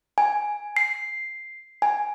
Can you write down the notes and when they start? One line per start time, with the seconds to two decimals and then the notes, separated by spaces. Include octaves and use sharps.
0.18 G#5
0.77 C7
1.82 G#5